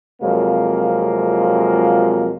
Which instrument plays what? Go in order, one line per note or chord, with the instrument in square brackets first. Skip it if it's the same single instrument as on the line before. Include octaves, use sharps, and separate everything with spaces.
[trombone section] F2 C3 F#3 G#3 A#3 F4